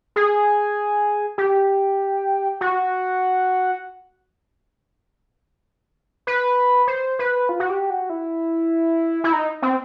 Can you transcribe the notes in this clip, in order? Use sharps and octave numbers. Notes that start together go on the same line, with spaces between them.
G#4
G4
F#4
B4
C5
B4
F4
F#4
G4
F#4
E4
E4
D#4
C4